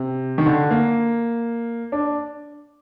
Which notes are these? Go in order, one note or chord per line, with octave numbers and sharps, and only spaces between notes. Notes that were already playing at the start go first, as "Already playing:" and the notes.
Already playing: C3
D#3
D3
A#3
D4